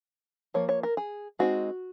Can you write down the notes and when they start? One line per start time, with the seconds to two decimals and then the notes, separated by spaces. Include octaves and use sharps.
0.54 F3 A#3 C#5
0.69 C#5
0.83 A#4
0.97 G#4
1.39 G#3 C4 D#4 F#4